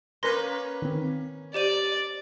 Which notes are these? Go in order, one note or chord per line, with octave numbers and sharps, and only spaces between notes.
A#3 C#4 A#4 B4 A#5 C6 G6 A#6
D#3 C4
G4 C5 D5 D#7